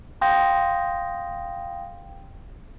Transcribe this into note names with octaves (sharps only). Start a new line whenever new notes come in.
F5 G5 C6 D#6 G6 A#6